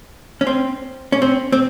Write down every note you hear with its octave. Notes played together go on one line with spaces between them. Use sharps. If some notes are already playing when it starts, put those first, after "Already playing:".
C#4
C4
C#4
C4
C4